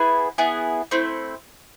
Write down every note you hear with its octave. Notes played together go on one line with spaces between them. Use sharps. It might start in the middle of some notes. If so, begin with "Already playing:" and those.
Already playing: B3 E4 G#4
B3 E4 G#4
A3 C4 E4